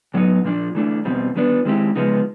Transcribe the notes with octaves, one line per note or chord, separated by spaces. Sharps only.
A2 F#3 B3 D#4
A#2 F3 A#3 D4
E3 A3 D4
E2 B2 G3 C4
D#3 G3 B3 D4
D#3 G#3 C4 E4 G4
C#3 F3 G#3 B3 D#4